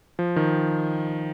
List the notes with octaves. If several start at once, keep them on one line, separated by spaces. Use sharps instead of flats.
F3
D#3